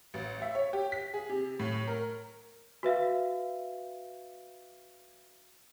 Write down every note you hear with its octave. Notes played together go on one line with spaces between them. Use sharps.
A1
E5
C#5
G4
B6
G#4
C3
A2
A#4
F#4 B4 E5 F5